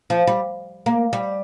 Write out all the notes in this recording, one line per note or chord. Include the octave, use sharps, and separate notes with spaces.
F3
G3
A#3
G3